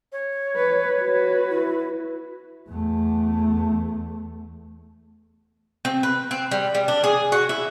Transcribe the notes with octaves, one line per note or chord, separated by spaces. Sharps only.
C#5
B4
F#4 B4
E4
E2 A3
C4
B4
C4
G3
G3
D4
G#4
F#4
E4